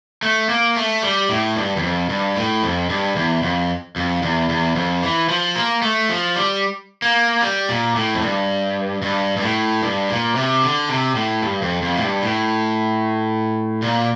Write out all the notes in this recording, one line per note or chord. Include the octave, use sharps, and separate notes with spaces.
A3
A#3
A3
G3
A2
G2
E2
F2
G2
A2
F2
G2
E2
F2
F2
E2
E2
F2
E3
F3
A#3
A3
F3
G3
A#3
G3
A#2
A2
F2
G2
G2
G2
A2
G2
A#2
C3
D3
C3
A2
G2
F2
F2
A2
G2
A2
A#2